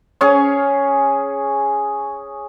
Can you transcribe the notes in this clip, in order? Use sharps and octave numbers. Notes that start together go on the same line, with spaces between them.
C#4 G#4 C#5